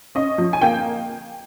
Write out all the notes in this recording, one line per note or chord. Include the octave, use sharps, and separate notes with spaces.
C#4 D#5
F3
G#5
A#3 G5